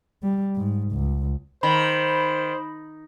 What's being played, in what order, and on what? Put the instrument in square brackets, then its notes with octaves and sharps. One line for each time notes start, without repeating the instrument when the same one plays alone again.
[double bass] G3
G#2
C#2
[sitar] D#3 [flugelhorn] C5 [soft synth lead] B5